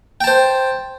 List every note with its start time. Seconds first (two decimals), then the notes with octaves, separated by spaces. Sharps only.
0.21 G5
0.24 A5
0.27 C5